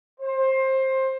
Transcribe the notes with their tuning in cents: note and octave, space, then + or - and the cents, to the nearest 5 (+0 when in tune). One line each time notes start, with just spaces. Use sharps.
C5 +20